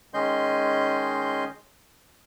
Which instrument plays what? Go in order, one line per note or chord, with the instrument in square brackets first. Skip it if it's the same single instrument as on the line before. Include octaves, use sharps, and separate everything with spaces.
[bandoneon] D#3 G#3 C#4 D#5 C6 G6